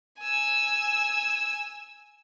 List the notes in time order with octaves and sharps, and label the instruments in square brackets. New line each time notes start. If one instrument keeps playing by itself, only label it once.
[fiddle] G#5 E6